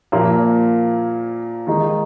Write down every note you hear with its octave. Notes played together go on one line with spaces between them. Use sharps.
A#2 F3 A#3
D#3 G#3 D#4